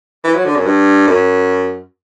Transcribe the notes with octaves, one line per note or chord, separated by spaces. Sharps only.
E3
F#3
D3
F#2
G2
F#2